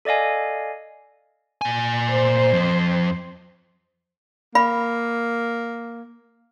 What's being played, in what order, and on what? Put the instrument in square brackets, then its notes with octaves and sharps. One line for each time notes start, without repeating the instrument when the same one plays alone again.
[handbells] A4 D5 D#5 F5 G#5
[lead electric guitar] A#2 G#5
[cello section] C5
[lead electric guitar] F2
[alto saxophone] A#3 [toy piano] F5 B5